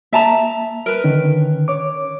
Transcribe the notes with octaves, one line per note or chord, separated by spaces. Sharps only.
A#3 E5 A5 A#5
A#4 B4
D3 D#3 C#4
C#5 D6